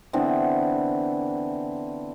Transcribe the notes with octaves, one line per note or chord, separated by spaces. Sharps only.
D3 E3 B3 C4